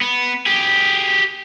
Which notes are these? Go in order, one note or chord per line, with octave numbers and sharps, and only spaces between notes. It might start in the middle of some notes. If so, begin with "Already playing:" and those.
B3
G4 G#4